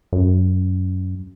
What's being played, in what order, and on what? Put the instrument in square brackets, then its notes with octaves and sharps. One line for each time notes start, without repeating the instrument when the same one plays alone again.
[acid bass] F#2